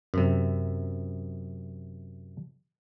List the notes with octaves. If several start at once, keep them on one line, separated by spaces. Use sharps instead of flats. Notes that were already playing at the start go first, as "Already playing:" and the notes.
F#2 C3